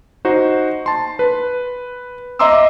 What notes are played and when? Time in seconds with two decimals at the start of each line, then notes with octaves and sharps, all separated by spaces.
0.25 D#4 F#4 C5
0.86 A5 C6
1.19 B4
2.39 D#5 E5 A#5 C6 D6 E6